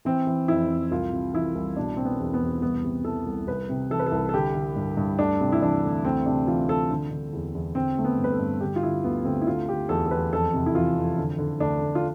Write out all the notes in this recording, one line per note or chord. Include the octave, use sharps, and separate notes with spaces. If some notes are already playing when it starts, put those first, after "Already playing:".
E3 C4
E3
F2 E4
F2
C2 F4
C3
E3 E4
C2
B2 D4
B2 C4
B3
E2
B3
E2
C2 B3
C3
E3 A4
C2
C2 B4
C3
E3 A4
B4
A4
C2
A4
D3 G4
D3
G2
G2
D2 D4
C3
E4
E3 D4
D2
D2 C4
C3 D4
E3 F4
D2 A4
D3
D3
E2
E2
D3 C4
D3 A3
B3
G2
B4
A4
G2
D3 G4
F4
D3 E4
D2 B3
D2 C4
E4
D3 F4
D3 G4
E2 A4
A4
E2 B4
F2 A4
C3
E4
E3 F4
F2
D3
D3
D2 D4
D2
F4